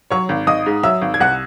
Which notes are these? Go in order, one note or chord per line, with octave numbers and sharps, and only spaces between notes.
F#3 C#5 C#6
G#1
G#1 D#5 D#6
G#2
F#3 E5 E6
G#1
G#6
C2 F#5 F#6